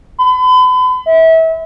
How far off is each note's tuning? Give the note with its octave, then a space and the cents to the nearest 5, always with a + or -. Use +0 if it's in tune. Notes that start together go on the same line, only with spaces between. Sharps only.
B5 +40
E5 -30